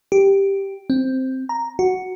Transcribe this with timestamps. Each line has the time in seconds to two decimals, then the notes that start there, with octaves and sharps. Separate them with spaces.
0.12 G4
0.90 C4
1.49 A#5
1.79 F#4